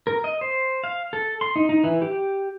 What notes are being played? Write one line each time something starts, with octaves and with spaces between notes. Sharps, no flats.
A#4
D#5
C5
F5
A4
C6
D#4
D#4
E3
G4